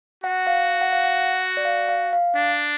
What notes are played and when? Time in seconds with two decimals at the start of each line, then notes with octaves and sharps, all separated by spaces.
0.24 F#4 F#5
0.47 F5
0.81 F#5
0.92 F5
1.04 F#5
1.57 D5
1.65 F5
1.89 F5
2.13 F5
2.36 D4